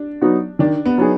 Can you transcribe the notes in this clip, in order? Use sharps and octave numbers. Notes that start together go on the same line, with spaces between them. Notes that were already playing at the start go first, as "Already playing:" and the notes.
Already playing: D4
F#3 B3 D#4 F#4
D#3 D4
B3
F#3 B3 D#4 G#4